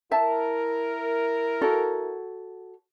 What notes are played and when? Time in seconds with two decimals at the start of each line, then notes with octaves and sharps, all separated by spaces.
0.11 E4 A#4 E5 A5
1.62 F#4 A4 C#5